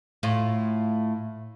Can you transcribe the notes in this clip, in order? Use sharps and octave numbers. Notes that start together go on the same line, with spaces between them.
A2 F4